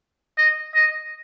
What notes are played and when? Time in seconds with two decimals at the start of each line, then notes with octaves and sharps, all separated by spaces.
0.38 D#5
0.75 D#5